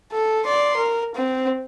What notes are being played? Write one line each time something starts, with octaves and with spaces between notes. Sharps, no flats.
A4
D5 C6
A#4
C4